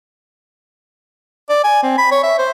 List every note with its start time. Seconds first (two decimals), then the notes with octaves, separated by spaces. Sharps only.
1.49 D5
1.64 G#5
1.83 C4
1.98 B5
2.11 C#5
2.23 E5
2.38 C5